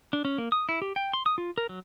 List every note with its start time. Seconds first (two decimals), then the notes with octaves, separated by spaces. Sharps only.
0.13 D4
0.25 C#4
0.38 A#3
0.52 D#6
0.69 E4
0.82 G4
0.96 G5
1.13 C6
1.26 D#6
1.38 F4
1.58 A#4
1.69 F#3